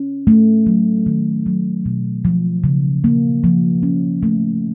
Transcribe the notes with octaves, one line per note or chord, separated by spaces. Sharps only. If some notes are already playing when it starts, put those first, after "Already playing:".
Already playing: C#4
A3
F#3
D#3
F#3
B2
F3
C#3
A#3
F3
C#4
A3